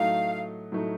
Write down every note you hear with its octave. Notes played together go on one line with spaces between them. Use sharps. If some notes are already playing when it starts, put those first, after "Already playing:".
Already playing: A2 F#3 A3 D#4 F5
A2 F#3 A3 D#4